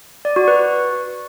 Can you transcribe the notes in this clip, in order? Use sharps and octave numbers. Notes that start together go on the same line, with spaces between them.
D5
F#4
B4